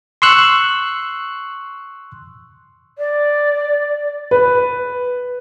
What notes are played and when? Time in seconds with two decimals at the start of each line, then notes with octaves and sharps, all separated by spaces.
0.22 C6 C#6 E6 F#6
2.98 D5
4.31 B4